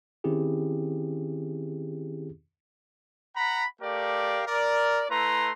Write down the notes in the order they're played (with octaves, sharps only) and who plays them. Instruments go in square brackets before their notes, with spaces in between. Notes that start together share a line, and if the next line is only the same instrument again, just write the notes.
[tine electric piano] D#3 C4 C#4 E4 G4 G#4
[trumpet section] F#5 A#5 B5
A3 G4 A#4 D5 F5
A#4 D5
A3 E4 B4 A#5 C6